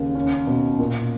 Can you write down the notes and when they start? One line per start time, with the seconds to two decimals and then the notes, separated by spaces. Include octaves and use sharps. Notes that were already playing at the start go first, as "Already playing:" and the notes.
Already playing: D#2 C#3
0.15 C#4
0.47 B2
0.79 A#2